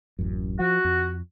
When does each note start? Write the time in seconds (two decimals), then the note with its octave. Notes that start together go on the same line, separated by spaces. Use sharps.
0.19 D1 A1 F#2
0.60 F3 F#4
0.85 F2